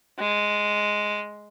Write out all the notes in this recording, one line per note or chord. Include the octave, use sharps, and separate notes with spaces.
G#3